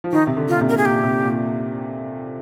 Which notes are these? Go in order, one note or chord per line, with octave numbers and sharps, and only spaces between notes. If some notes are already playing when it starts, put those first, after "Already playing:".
F3
D#3 D#4
C3
D3
F4
A#2
C3
A#4
G#4
A#2 G4
C3
A#2